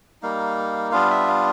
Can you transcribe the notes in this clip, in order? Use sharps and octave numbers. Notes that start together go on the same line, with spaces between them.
G3 A#3 D#4 F5
G3 B3 D4 F4 F5
E5
F5